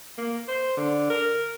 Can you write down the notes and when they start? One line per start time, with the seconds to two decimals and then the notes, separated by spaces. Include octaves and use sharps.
0.18 A#3
0.48 C5
0.77 D3
1.10 A#4